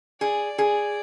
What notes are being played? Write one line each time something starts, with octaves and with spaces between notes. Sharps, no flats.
G#4 D5
G#4